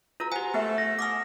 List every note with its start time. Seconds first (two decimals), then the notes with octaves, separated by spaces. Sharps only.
0.20 F4 F#4 B4 A#5 E6
0.32 G4 C5 F#5 G#5
0.54 A3 B3 C5 E5
0.78 A#6
0.99 F#5 G#5 D6 D#6 F6